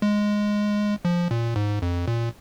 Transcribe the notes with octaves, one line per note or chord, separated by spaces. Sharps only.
G#3
F3
A#2
G#2
F2
A#2